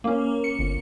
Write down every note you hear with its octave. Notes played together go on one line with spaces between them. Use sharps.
A#3 C#4
C#7
G1